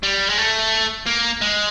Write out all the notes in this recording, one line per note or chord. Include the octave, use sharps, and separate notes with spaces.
G3
G#3
A3
A#3
G#3